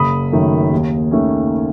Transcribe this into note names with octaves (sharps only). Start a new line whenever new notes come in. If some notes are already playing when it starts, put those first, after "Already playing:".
Already playing: F#1 B5 D#6
F#2 D#3 A3
D#2
D#3 A3 C#4